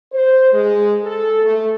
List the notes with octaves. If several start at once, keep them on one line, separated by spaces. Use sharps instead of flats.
C5
G#3
A4
A3